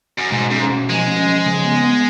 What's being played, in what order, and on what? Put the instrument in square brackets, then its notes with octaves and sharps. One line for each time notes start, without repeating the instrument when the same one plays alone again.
[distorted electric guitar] F#2
[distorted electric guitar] G#2 [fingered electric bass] B2
[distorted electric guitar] G#2 [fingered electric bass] C#4
[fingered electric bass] B2
[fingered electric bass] F3 [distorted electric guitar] G#3
[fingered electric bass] C#4
F3
C#3
B3
B3